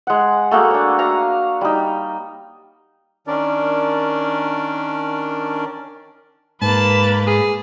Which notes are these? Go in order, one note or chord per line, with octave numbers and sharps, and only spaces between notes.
G#3 F#5
A3 A#3 F#4 G#4
D4 C#5
F#4 F5 A#5
G3 D#4
D#3 C#4 D4 A#4 D5
G#2 A#3 B4 A5
G#4